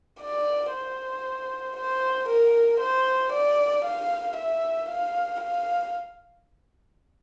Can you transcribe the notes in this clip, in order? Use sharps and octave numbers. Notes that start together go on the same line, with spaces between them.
D5
C5
C5
A#4
C5
D5
F5
E5
F5
F5